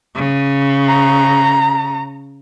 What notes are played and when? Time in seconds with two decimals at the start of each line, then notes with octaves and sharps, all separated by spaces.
0.15 C#3
0.88 A#5